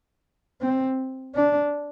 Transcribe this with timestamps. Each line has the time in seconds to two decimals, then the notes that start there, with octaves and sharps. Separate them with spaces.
0.61 C4
1.35 D4